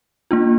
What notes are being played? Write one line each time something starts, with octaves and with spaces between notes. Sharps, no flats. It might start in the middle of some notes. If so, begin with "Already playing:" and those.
A#3 D4 F4